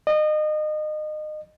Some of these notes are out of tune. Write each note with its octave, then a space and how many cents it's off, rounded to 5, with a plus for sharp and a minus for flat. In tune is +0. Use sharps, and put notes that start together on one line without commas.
D#5 -30